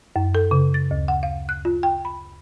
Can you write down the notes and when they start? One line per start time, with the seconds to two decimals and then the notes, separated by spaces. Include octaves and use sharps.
0.16 F#2
0.35 A4
0.51 C#3
0.74 A6
0.91 D2
1.08 F#5
1.23 F5
1.49 F#6
1.65 F4
1.83 G5
2.05 B5